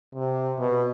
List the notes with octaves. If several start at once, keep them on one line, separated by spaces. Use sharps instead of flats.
C3
B2